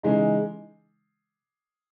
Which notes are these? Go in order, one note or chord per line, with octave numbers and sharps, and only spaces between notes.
C#3 E3 G#3 D#4